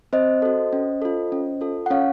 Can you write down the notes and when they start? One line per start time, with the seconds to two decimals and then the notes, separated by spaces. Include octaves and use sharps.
0.13 C4 C5 D#5
0.42 F#4 A4
0.73 C#4
1.02 F4 A4
1.32 C#4
1.61 F4 A4
1.86 F#5
1.90 C#4 C#5 F5